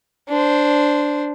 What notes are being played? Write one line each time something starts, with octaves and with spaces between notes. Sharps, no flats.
D4 C5